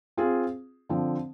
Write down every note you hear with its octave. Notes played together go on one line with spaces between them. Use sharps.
C4 F4 G#4
D3 F3 C4